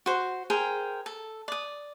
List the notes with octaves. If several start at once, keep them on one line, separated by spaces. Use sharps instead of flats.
F#4 C5
G#4 A#4 C5 G5
A4
D5 D#6